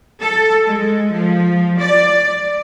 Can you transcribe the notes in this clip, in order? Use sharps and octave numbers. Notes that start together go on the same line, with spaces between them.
A4
G#3
F3
D5